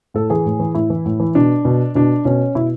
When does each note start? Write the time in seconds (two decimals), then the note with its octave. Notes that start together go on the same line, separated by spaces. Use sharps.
0.14 A2 A4
0.30 E3 G#4
0.46 A2
0.60 E3
0.75 A2 E4
0.90 E3
1.06 A2
1.20 E3
1.35 B2 D4
1.65 B2
1.95 B2 D4
2.25 B2 C#4
2.55 B2 E4